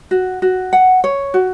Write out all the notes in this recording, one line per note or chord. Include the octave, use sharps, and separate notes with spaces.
F#4
F#4
F#5
C#5
F#4